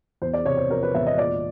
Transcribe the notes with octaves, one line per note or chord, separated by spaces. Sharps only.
E2 C5
D5
C3 C#5
C5
F3 A#4
B4
E1 E5
D#5
A#2 D5